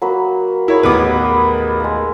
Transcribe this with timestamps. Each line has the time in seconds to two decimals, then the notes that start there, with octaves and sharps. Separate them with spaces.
0.02 F#3 A#3 B4
0.68 E4 G#4 A#4 C#5 B5
0.83 A1 D#2 B3 D#4 B4 D6
1.80 G#3 A#3